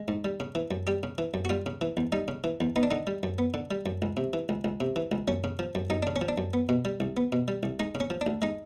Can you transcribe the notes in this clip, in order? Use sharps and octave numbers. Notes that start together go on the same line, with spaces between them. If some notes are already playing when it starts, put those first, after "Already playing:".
Already playing: G#3
G#2
G3
C#3
E3
F#2
G3 G4
C#3
E3
F#2
F#4
G3 F4
C#3
E3
E2
G3 D#4
C#3
E3
E2
B3 D#4
D4
D3 D#4
G3
F#2
B3
D3
G3
F#2
C#2
C3
E3
C#2
C#2
C3
E3
C#2
F#2 C#4
C#3
F3
F#2
F#2 D#4
C#3 D4
C#4
F3
D4
F#2
B3
B2
G3
C2
B3
B2
G3
C2
G#3 D#4
C#3
C#4
F3
D4
D2
G#3 D#4